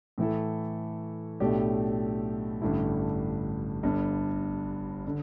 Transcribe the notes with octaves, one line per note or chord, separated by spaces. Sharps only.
A2 E3 A3 E4 A4
B1 A2 A3 D4 G4
A1 G2 D3 A3 E4
G1 G2 D3
D3